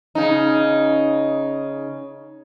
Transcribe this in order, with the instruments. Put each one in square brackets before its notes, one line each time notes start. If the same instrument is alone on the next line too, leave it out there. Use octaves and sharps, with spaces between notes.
[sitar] C#3 D#4